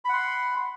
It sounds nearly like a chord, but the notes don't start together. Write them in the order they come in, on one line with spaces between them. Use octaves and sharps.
B5 F#5 C6